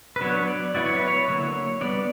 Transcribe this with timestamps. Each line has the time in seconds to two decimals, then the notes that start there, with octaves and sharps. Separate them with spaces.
0.16 B4
0.21 F#3 B3 D4 C#5
0.48 D5
0.75 F#3 B3 E4 D5
0.86 C#5
0.96 B4
1.07 C#5
1.28 D3 F#3 A#3 E4
1.81 G3 B3 D4 D5